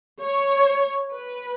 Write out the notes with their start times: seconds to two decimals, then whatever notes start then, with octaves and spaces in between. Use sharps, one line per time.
0.21 C#5
1.12 B4